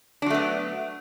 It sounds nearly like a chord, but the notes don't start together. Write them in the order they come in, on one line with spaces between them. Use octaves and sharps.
D4 F#3 A3 B3